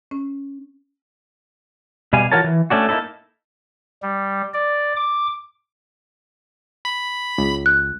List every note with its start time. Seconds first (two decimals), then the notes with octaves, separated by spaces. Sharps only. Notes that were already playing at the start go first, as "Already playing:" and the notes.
0.11 C#4
2.13 B2 G3 F5 G#5
2.32 E3 F4 F#4 A#4 C#5 A5
2.44 E3
2.70 A3 C#4 D4 F#4
2.89 A#3 B3 D#4 E4 A4
4.02 G3
4.54 D5
4.96 D6
6.85 B5
7.38 C#2
7.66 F#6